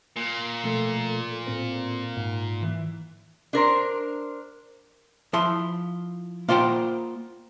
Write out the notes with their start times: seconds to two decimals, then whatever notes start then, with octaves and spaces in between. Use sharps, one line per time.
0.16 A#2
0.64 B2 F3 A3 A4
1.47 A2 C4 C5
2.17 G#2
2.62 E3
3.53 D4 A#4 C5
5.33 F3 E4 C6
6.49 A#3 F4 C5 F#5 G5